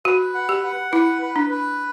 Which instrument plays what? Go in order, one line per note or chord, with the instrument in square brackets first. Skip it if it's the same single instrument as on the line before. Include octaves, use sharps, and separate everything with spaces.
[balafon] F#4 [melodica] B4
[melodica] F#5
[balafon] G4
[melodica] F#5
[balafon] E4 [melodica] B4
[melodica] B4
[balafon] D4
[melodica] B4